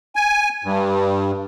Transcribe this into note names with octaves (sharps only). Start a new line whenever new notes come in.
G#5
G2